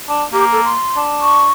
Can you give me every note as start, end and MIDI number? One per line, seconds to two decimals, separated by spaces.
0.09 0.24 62
0.33 0.73 58
0.33 0.45 67
0.52 0.60 69
0.65 1.00 84
0.96 1.48 62
1.21 1.52 85